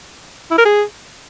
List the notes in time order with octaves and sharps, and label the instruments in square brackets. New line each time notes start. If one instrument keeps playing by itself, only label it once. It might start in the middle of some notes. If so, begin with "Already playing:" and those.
[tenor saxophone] E4
A#4
G#4